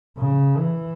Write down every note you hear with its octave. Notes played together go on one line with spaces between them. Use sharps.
C#3
E3